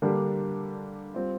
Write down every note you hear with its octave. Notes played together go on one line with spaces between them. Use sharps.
D3 G3 A#3 D4 G4
G3 C4 F4